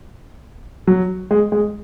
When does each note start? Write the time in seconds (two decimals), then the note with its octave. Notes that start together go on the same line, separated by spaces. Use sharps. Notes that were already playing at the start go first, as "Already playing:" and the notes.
0.87 F#3
1.31 G#3
1.52 G#3